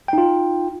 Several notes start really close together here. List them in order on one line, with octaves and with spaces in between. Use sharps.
G5 D#4 F4